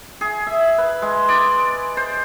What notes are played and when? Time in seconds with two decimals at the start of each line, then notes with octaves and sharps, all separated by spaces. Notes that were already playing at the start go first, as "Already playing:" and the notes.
0.21 G#4
0.47 E5
0.78 B4
1.02 G#3
1.28 D5
1.97 C5